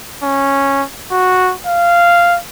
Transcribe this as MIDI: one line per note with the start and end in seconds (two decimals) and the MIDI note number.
0.23 0.83 61
1.11 1.53 66
1.67 2.38 77